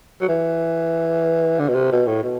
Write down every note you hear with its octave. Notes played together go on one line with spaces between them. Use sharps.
F#3
E3
D3
B2
C3
B2
A2
B2